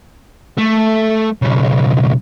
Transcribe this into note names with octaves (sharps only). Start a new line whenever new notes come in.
A3
B1 C#3